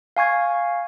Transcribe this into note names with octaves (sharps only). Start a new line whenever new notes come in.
F5 G#5 C#6 G#6